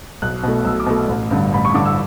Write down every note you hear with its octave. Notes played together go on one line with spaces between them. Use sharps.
B1 F#6
B2 A3
B1 E6
D6
B2 A3
A1
G2 D3
A1 B5
C#6
G2 D3 D6
E6